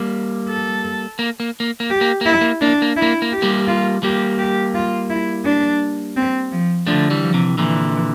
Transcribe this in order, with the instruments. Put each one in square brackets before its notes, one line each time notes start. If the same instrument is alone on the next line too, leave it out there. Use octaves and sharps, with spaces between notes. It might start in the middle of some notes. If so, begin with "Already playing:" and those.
Already playing: [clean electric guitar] G3 A#3
[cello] A4
[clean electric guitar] A#3
A#3
A#3
A#3
[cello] G4
[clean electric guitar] A#3
[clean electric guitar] A#3 [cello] E4
[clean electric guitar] A#3
[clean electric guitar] A#3 [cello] D4
[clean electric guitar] A#3
[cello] E4
[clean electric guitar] A#3
A#3
[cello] G4
[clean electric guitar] G3 A#3
[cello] F4
[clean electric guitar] G3 A#3 [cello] G4
[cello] G4
F4
E4
D4
C4
F3
[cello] D3 [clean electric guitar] F3 A3
[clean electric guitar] E3 G3
[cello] F3
[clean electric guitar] C3 E3
[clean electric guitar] A#2 D3 [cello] E3